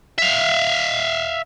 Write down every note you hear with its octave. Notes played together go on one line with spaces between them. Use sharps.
E5 F5